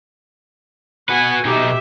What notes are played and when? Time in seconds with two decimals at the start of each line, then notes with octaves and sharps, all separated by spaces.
1.09 F#4 B4 F#5 G#5
1.45 B2 D#4 G4 E5